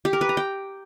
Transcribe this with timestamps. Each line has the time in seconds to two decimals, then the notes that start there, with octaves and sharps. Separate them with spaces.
0.05 G4
0.13 A#4
0.21 B4
0.29 A#5
0.37 G5